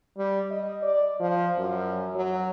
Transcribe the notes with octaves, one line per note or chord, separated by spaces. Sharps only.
G3
D#5
D5
F3
F#2
F#3